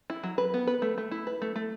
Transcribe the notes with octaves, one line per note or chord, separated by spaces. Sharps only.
E4
F#3
B4
B3
B4
A3
A3
E4
B4
A3
A3